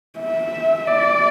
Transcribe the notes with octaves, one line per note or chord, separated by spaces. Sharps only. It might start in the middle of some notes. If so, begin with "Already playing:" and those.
E5
D5